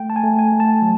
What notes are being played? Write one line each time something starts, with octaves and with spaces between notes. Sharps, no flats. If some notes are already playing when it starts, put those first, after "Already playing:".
Already playing: A3 G5
A5
G#5
A3
G#5
A3
A5
F#3